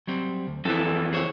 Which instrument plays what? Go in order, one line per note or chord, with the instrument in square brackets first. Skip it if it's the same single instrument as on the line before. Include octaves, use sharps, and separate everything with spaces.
[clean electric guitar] F#3 G3 C4
D2
[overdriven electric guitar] F2 E3 [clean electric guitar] A4
[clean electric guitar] G#4 C5 C#5